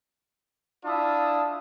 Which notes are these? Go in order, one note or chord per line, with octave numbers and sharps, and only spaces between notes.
D4 E4 F4 E5 A5 D#6